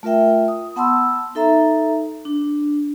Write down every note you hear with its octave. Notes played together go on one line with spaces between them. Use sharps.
A3 F4 A#4 E5 G5
D#6
B3 F#5 A5 B5 C6 E6
D#4 A4 E5 A#5
D4